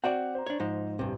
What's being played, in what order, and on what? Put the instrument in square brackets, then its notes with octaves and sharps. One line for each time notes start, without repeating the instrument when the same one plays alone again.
[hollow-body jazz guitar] C4 F#4 D5 [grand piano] F#5
[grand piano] C5 A#5
[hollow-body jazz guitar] D4 C#5
G#2 F3 D#4
[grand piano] A1 [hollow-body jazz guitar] G2 C3